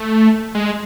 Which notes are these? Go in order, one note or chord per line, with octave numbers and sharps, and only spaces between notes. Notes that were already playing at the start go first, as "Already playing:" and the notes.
Already playing: A3
G#3